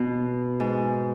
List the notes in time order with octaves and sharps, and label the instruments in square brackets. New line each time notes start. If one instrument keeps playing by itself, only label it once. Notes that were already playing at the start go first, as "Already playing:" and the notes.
Already playing: [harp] B2 [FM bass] B3
[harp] G#2